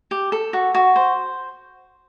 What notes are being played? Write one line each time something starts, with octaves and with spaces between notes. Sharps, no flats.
G4
A4
F#4
F#4
C5